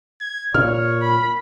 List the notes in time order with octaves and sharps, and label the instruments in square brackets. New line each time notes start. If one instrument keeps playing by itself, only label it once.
[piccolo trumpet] G#6
[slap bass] A#2 [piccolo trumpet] C#5 [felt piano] F6
[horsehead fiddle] B5